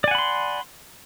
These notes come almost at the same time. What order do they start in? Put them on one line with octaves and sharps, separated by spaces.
D5 G#5 F#5 B5 C6